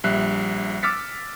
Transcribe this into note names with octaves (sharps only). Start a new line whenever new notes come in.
A#1 G3 E5 F#6 C7
D6 E6 F6 A6 B6 C#7